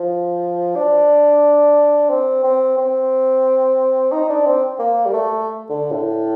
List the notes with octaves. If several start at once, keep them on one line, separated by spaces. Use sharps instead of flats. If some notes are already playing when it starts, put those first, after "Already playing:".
Already playing: F3
D4
C4
C4
C4
D#4
D4
C4
A#3
G3
A3
D3
A2